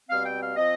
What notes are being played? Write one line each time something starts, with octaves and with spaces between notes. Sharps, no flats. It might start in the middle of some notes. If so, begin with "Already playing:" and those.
B2 G3 C4 F5
G5
F5
F3 C4 D#5